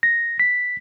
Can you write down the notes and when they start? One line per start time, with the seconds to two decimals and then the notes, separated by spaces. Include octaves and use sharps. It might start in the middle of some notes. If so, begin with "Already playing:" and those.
0.03 A#6
0.39 B6